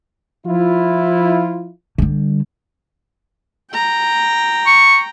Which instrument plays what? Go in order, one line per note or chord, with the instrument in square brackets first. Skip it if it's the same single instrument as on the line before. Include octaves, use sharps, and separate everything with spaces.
[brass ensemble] F3 E4 F4
[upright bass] D3 G3
[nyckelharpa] G5 A#5
[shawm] C#6